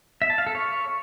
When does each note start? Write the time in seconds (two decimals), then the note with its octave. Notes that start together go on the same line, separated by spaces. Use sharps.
0.22 E5
0.30 A5
0.38 F5
0.46 A4
0.55 C#5